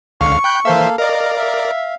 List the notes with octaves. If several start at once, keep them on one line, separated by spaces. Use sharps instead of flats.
C#2 D3 F5 C#6
G5 B5 F#6 G6
E3 A#3 A4 C5 E5 F5
A#4 D5 D#5 F5
E5